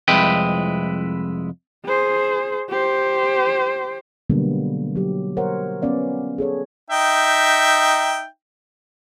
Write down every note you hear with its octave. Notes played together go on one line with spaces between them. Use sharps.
C2 F2 G#3 E4 B4 G5
G#4 C5
G4 C5
B2 D3 F#3 G3 A#3 B3
F#3 G4
A#4 C5 C#5 F#5
B3 C#4 D5 F5
G#4 A4 C#5
D#4 E5 G5